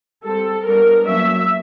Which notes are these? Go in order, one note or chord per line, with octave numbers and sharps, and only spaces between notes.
G3 C4 A4
G3 B3 D4 A#4
F#3 A#3 C#4 E5